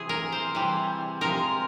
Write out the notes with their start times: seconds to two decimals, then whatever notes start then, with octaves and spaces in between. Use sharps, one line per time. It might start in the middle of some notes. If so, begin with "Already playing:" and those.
Already playing: C3 E3 G#4
0.09 A#4
0.32 C5
0.55 C3 E3 G3
1.21 C3 F3 G#3 A#4